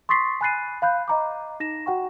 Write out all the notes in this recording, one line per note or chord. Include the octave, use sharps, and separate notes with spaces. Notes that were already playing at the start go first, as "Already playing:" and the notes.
C6 C#6 D#6 A6 B6 C7
G#5 B5 F#6 A6 C7 D#7
F5 B5 F#6 G6
D#5 A#5 D6
D#4 A#6 E7
F#4 F#5 G5 C#6